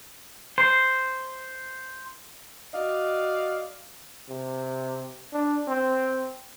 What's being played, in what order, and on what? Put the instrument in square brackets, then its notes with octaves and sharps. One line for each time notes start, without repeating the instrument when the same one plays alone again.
[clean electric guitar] C5
[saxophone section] F#4 D5 D#5 F5
[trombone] C3
D4
C4